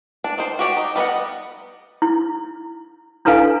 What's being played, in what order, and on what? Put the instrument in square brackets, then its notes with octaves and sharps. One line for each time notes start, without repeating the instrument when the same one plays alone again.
[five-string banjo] D4
D#3 C5
F#4 G4 C#5 D5
D#4
G3 B3 B4 D#5 F#5
[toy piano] E4
D4 E4 A4 B4 F5 G#5